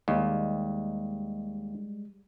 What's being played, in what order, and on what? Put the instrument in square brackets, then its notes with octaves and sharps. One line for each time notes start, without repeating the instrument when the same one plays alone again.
[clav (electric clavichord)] D#2 [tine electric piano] G3 G#3